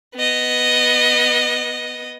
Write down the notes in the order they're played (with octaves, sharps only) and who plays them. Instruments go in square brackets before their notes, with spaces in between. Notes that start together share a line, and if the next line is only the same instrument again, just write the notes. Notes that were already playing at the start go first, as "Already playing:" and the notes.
[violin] B3 D#5